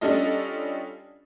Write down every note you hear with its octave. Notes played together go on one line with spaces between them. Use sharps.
G3 C#4 D4 F4 A4 D#5